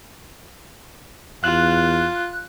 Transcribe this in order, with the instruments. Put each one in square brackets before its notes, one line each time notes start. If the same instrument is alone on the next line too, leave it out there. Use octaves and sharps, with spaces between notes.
[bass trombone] E2 [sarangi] F4 [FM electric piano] F#6